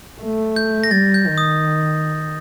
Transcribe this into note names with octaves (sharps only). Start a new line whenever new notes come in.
A3
G6
A#6
G3 A6
G6
D#3
D#6